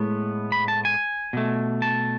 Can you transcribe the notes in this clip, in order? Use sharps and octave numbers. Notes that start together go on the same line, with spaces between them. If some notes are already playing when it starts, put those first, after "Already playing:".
Already playing: A2 G#3 B3
B5
A5
G#5
B2 A3
A5